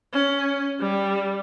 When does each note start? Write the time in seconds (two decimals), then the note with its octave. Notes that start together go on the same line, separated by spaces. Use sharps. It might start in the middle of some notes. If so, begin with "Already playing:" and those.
0.13 C#4
0.80 G3